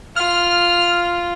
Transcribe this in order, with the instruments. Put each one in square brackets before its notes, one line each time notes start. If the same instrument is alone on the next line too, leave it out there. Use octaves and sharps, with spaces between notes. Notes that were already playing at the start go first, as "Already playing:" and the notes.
[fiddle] F4 [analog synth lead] F6